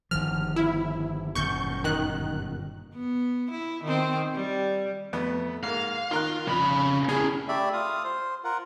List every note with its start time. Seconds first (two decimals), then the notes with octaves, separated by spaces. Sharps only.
0.11 G1 D#3 F3 F6
0.56 E4
1.35 G1 F#2 A#2 C#6 G6
1.84 D#3 F#6
2.94 B3
3.51 E4
3.84 D#3 C4
4.34 G3
5.13 F2 A3 B3
5.63 G#2 A#3 F5
6.11 D#3 F4 A#4 F5 F#6
6.47 F2 C#3 B5
7.09 C#4 E4 G#4
7.48 A3 G4 D5 E5 B5
7.73 F4 F5 D#6
8.04 C5
8.44 F4 A#4 F#5